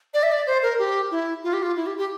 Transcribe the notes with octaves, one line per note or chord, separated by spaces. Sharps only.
D5
E5
D5
C5
A#4
G4
E4
F4
G4
F4
E4
G4
G4